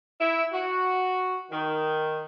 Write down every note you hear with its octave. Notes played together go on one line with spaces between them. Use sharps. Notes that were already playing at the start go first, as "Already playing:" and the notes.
E4
F#4
D#3